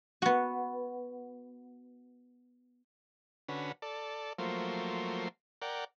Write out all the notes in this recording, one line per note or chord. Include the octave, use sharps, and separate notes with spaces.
B3 F#4
D3 C#4 F#4 B4
A4 D5
F3 F#3 A3 A#3 C5
A#4 D5 F#5 G5